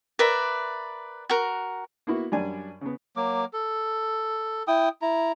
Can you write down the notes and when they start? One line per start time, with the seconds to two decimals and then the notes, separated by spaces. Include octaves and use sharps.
0.19 A#4 B4 D5 E5
1.30 F#4 A#4
2.07 A#3 B3 E4 F#4
2.32 F#2 G3 D4 G#5
2.81 C#3 B3
3.16 F#3 A#3 D6
3.53 A4
4.68 E4 G5 D#6
5.02 E4 A#5